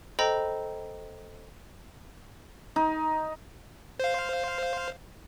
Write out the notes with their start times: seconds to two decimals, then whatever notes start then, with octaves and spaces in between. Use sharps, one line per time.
0.19 A4 C5 D#5 G5 A#5 B5
2.76 D#4
4.00 C5 F5